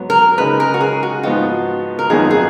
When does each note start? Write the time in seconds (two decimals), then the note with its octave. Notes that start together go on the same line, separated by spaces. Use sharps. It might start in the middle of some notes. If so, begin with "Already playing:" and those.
Already playing: G#2 F#3 B3
0.10 A#4
0.38 C#3 G#3 D#4 B4
0.60 A#4
0.74 F#4
0.81 G#4
1.03 F#4
1.23 G#2 F3 B3 D#4 F4 F#4
1.99 A#4
2.10 G#1 F#2 F3 B3 D#4 G#4
2.31 G#4